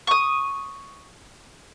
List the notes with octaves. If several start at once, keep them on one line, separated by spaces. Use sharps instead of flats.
C#6 D#6